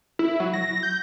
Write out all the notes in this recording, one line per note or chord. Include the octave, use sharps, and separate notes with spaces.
E4
F#3
A#6
G6